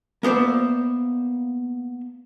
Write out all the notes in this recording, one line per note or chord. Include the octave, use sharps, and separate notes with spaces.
A#3 B3 C5 D5 E5